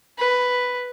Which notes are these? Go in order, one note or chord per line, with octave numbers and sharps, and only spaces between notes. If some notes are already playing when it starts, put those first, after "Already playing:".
B4